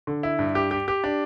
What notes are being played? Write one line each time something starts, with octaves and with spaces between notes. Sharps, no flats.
D3
E4
G2
G4
G4
G4
D4